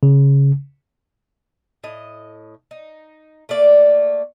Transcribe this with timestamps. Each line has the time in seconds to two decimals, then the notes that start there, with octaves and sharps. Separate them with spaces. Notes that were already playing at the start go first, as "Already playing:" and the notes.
0.03 C#3
1.84 A2 D#5
2.71 D#4
3.49 A3 A#3 D5